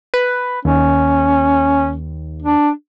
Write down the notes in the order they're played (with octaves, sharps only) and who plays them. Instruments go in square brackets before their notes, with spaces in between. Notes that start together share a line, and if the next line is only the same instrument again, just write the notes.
[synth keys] B4
[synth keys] D#2 [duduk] C#4
[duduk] D4